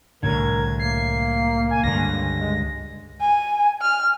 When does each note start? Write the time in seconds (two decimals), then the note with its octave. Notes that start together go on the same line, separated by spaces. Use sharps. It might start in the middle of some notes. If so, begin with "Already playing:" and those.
0.23 C2 A2 D3 A#4 G#6
0.79 A#3 C7
1.71 G#5
1.84 C#2 G2 D3 A#6
2.38 G#3
3.21 G#5
3.82 F6